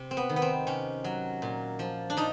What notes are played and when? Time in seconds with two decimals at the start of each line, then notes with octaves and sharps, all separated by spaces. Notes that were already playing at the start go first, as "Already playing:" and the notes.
Already playing: C3
0.11 C4
0.17 B3
0.29 D#3
0.36 B3
0.42 C4
0.67 C3 C#4
1.04 F#3
1.42 A#2
1.79 F3
2.10 D4
2.17 F3 D#4